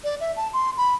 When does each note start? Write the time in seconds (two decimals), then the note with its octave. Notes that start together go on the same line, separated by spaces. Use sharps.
0.04 D5
0.20 E5
0.37 A5
0.53 C6
0.77 B5